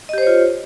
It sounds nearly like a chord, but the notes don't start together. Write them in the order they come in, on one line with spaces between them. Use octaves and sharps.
D#5 G4 C5 C#5 F4